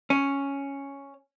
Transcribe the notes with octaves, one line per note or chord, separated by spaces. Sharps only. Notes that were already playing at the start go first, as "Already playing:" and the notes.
C#4